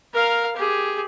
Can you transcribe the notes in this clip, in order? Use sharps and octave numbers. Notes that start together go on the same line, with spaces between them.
A#4 F5
G4 G#4